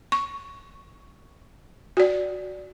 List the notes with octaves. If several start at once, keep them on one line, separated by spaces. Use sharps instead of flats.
C#6
F#4 D5